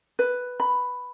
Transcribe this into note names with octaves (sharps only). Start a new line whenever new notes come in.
B4
B5